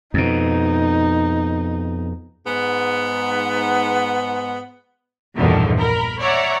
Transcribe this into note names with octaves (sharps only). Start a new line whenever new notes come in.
F2 B2 D#4
G#2 B3
A#1 E2 G2 B2 D3 D#3
A#4 B5
C#5 D5 E5 F#5 A#5